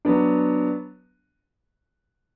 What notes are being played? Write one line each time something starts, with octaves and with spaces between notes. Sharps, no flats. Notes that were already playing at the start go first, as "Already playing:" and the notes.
F#3 B3 D4